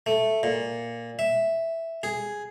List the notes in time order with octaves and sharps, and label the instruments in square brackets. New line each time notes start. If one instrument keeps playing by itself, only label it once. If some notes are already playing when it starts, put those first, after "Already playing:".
[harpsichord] A3
A#2
E5
G#4